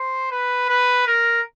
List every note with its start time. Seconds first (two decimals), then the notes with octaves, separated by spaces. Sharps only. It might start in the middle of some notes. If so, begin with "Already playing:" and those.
Already playing: C5
0.31 B4
0.69 B4
1.07 A#4